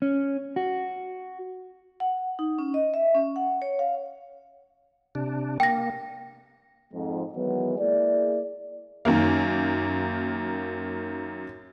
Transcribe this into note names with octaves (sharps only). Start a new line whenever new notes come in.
C#4
F#4
F#5
D#4
C#4
D#5
E5
C#4
F#5
C#5
F5
C3 D4
A#3 G5 A#6
F2 G#2
D#3 E3 F#3 G#3 B3
A#3 E4 G#4 D5
F#2 D#3 A#3